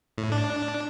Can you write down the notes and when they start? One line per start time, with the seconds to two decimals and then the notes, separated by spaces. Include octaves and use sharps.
0.18 A2
0.32 D4